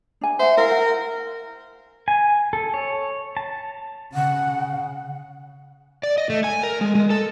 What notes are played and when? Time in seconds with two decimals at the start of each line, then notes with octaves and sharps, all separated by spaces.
0.21 D4 G#5
0.39 C5 E5 F#5
0.57 E4 A#4 F5
0.72 F#5
2.08 G#5
2.53 A4
2.74 C#5
3.37 A5
4.14 C#3 F#5
6.03 D5
6.18 D#5
6.30 A3
6.44 G#5
6.63 A#4
6.81 G#3
6.95 G#3
7.10 A4